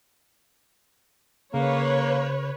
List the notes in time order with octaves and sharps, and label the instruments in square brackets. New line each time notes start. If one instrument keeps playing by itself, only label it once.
[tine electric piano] C#3 [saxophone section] A#3 [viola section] B4 C#5